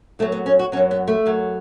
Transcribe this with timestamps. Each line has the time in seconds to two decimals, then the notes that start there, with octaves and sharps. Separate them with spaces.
0.19 F#2 F#3 A3
0.32 B3
0.46 C#4
0.59 F#4
0.72 F#3 C#4
0.77 F#2
0.91 B3
1.08 A3
1.26 F#2 F#3